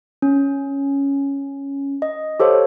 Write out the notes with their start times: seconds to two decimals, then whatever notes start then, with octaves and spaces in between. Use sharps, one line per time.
0.22 C#4
2.02 D#5
2.40 G4 A4 C5 C#5 F5